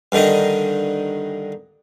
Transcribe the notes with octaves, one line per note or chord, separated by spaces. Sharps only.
G2 D3 D#3 D#4 D#5